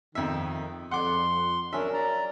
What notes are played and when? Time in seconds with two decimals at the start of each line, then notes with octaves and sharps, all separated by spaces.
0.15 F2 D#3 E5
0.91 F2 F#5 C6 D6
1.73 F#3 C#4 D4 A#4 E5
1.94 D5 A#5